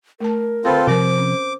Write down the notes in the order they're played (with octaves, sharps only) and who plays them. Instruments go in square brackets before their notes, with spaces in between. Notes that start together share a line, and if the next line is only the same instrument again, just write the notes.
[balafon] A3 A5 [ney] A#4
[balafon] D3 C5 [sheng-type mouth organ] C4 F4 A4
[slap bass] C3 F3 [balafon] C4 A#4 [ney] C5 [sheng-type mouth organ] D6
[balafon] C#4